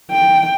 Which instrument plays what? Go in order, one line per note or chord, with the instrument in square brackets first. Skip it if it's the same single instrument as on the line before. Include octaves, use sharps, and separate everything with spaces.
[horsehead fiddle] G5